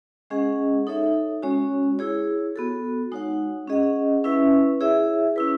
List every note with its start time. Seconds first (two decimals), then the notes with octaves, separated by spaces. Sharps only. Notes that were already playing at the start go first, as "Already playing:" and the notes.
0.30 G#3 C#4 G#4 D#5 F#5
0.87 D#4 A4 C#5 E5
1.43 G#3 C#4 F#4 C#5
1.99 E4 G#4 C#5
2.56 B3 F#4 A4
3.12 G#3 D#4 F#4 C#5 F#5
3.68 C#4 G#4 D#5 F#5
4.24 C#4 E4 B4 E5
4.81 E4 G#4 C#5 E5
5.36 C#4 E4 B4